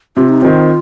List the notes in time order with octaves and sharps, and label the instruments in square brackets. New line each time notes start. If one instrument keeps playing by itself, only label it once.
[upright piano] C3 [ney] F4
[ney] D#4
[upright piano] D#3 C4 [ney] F4